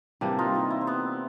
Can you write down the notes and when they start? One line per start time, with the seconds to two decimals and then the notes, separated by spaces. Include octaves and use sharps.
0.21 C3 E3 G3 A#3 D4
0.39 D#4 F4
0.55 D#4
0.71 E4
0.81 C4
0.87 B3